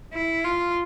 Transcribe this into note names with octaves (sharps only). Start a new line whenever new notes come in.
E4
F4